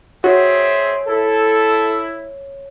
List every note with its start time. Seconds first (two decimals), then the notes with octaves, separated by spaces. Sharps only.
0.24 C4 F#4 G#4 C#5 E5
1.08 E4 A4